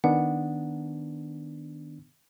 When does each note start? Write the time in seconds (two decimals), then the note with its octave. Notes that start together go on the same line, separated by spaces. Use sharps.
0.04 D#3 B3 D4 F#5